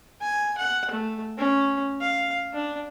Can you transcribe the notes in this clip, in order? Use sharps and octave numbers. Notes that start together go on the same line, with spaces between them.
G#5
F#5
A3
C#4
F5
D4